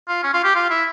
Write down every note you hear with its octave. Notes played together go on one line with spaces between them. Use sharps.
F4
C#4
F4
G4
F4
E4